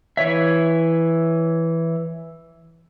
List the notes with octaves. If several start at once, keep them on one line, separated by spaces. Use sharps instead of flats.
E3 C#5 E5